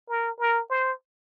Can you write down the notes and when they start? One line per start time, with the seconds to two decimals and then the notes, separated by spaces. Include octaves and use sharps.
0.09 A#4
0.40 A#4
0.70 C5